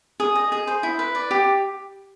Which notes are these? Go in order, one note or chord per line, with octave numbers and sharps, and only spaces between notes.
G#4
D#5
G#4
C5
E4
B4
D5
G4